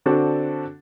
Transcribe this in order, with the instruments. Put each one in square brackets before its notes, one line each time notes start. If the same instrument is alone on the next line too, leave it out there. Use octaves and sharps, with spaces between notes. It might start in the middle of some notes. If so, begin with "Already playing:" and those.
[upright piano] D3 C4 D4 F#4 A4